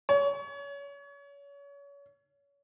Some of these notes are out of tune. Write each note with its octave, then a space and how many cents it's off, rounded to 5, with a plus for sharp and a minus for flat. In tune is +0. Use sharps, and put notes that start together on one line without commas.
C#5 +30